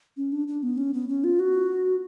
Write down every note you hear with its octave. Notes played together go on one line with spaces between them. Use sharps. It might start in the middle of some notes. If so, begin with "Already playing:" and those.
C#4
D4
D4
B3
C#4
B3
C#4
F4
F#4